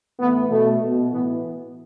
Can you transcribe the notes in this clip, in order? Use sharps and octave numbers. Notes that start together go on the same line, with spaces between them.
A2 E3 B3
B2 A3
B2
A2 E3 B3